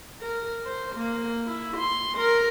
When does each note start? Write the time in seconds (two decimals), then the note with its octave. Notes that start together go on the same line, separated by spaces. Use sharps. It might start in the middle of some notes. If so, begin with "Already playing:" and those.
0.21 A#4
0.65 C5
0.96 A#3
1.47 E4
1.77 C6
2.18 A#4